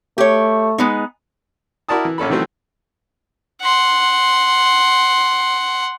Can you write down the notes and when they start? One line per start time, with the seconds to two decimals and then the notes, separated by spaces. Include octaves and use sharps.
0.18 A3 G4 C#5
0.78 G#3 B3 D#4
1.89 E4 F#4 A#4 D5 A5 D#6
2.05 E3
2.18 A#1 C#4 A4 B5
2.30 D#3 E3 F#3 A3 C4 C#4
3.62 F#5 C6